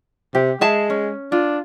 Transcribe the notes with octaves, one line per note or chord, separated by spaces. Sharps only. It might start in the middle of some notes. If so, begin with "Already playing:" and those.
C3 G4
G#3 G#4 E5 A5
C#4
D4 F4